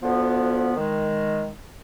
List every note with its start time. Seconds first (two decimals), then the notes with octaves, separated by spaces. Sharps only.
0.02 D2 D3 F3 B3
0.76 D#3 G#3